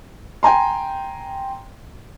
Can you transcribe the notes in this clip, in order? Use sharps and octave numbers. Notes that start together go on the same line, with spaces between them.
G5 G#5 A#5 C6